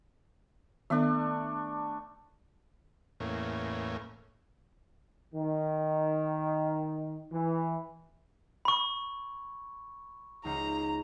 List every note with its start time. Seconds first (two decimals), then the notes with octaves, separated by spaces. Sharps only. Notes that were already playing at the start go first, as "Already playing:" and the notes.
0.90 D#3 A3 B3 D4
3.20 E2 A2 A#3 C#4
5.34 D#3
7.32 E3
8.65 B5 C#6
10.45 C#2 D#4 C5 A#5